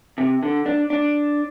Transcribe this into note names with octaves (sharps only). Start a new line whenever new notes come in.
C3
D3
D4
D4